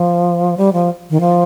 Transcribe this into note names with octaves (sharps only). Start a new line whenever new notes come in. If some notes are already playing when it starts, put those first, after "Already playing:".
Already playing: F3
G3
F3
D#3
F3